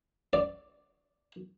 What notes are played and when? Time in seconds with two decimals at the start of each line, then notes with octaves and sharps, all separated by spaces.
0.33 D5